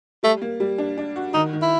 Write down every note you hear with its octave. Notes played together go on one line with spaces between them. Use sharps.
G3 A3
A#3
G3
D4
D4
F#4
D#3 D#4
D#3
E4